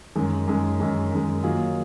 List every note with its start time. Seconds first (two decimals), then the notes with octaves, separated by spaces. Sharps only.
0.15 F#2 D#3 G#3
0.47 F#2 D#3 G#3
0.80 F#2 D#3 G#3
1.12 F#2 D#3 G#3
1.43 D#3 F#3 A#3 F4 G#4